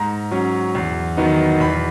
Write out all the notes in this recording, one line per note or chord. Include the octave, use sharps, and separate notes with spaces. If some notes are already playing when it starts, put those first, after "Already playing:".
Already playing: G#2 A#5
F#3 C#4
E2
D#3 F#3 B3 D#4
E2 B5